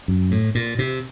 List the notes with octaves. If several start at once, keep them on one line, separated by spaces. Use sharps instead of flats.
F#2
A2
A#2
C3